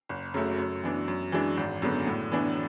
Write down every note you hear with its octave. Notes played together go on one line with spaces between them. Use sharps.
F#1
F#2 C#3 F#3 A3
F#2
E3 B3 D4
F#2
E3 G#3 D4
G#1
F#2 D3 G#3 B3
A2
E3 B3 D4